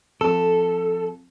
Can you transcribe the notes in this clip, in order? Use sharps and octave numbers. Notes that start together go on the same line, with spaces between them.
F2 A4